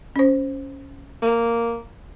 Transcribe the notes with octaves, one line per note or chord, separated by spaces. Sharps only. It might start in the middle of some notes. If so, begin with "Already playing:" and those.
C#4 C5
A#3